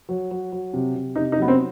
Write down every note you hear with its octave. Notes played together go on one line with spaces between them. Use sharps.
F#3
F#3
F#3
C3
C3
C3 D#4
D#4
F#3 B3
C4